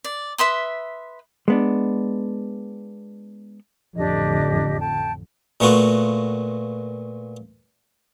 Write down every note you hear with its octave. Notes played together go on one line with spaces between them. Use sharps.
D5
B4 E5 C6 D#6
G#3 B3 D4
A1 F2 D3 D4 G4 D#5
G5 A5
A#2 A3 B3 F4 F#4